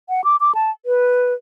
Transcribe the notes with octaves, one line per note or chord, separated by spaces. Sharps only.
F#5
D6
D6
A5
B4